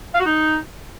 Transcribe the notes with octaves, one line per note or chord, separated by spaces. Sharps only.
F5
F#4
D#4